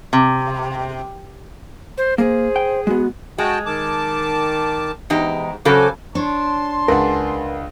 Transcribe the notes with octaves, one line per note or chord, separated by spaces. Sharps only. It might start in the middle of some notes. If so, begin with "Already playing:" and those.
C3
C5
A#3 G#4 C5
G5
G#3 B3 F#4
G#3 F#4 G5 A5
D#3 A5 D6
E2 G#2 D#4 G4
C#3 F#3 A4 C5 G#5 D6
D4 C#5 A5 C6
C#2 D4 G#4 A#4 B4 F#5